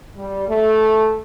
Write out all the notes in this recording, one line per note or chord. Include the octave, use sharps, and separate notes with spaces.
G3
A3